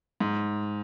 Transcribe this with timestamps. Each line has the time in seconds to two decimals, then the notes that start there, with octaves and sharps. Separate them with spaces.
0.20 G#2